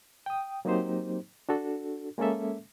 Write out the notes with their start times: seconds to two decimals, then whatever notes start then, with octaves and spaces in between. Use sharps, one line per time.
0.26 G5 D#6
0.65 F#3 A#3 C4 D#4 G4 C5
1.49 D4 F#4 A4
2.18 G#3 A#3 C#4 A4 E5